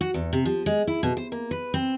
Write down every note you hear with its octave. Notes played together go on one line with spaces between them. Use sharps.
F#4
E2
C3
F3
G#3
E4
B2
C5
A#3
B4
C4